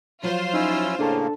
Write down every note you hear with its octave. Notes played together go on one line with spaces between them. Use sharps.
F3 F#3 F4 C5
C#4 D#4 E4 E6
A2 C#3 A#3 D4 A4 A5